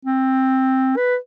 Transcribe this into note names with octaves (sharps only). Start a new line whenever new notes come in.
C4
B4